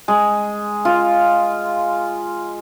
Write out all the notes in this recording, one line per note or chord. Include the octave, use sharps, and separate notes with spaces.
G#3
F4